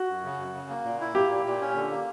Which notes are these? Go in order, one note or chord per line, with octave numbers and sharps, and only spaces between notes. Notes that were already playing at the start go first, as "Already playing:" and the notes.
Already playing: F#4
F#2
C#3
F#2
C#3
A#3
A#2
E4
A#3 G4
A#2
A#2
C#4
D3
A#3